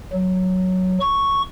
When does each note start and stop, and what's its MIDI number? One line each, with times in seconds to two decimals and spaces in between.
0.13 0.98 54
1.01 1.42 85